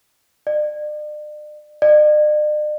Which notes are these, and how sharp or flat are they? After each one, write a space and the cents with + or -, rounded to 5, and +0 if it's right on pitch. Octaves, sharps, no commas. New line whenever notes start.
D5 +40
D5 +45